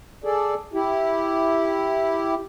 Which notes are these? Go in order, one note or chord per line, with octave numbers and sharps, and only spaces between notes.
G#4 A4 D5
E4 G4